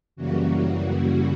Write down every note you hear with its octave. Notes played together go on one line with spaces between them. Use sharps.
F#2 C#3 E3 G3 A#3 F#4